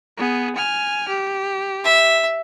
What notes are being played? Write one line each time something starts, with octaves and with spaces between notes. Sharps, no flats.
B3 G#4
G#5 F6
G4
E5